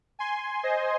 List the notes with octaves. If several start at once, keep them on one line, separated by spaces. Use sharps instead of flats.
G#5 C6
C5 D#5